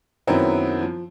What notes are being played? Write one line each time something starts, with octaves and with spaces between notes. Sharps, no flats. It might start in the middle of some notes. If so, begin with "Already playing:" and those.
F#2 D#3 F#3 B3 C4 E4
F3